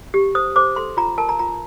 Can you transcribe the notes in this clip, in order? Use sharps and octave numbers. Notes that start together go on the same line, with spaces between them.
G4
C5 D#6
C5 D6
A4 C6
F4 A#5
A#4 A5
A#5
F4 A#5